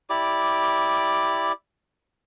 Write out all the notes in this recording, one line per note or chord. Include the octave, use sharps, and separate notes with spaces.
E4 G4 D5 D6